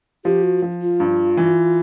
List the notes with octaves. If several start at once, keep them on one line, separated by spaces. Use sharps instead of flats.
F3 G4
F#4
F3
F4
G2
E3